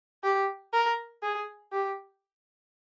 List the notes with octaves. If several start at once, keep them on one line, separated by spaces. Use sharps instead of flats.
G4
A#4
G#4
G4